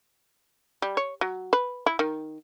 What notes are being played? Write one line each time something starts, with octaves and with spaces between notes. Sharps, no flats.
G3
C#5
F#3
B4
E4
D#3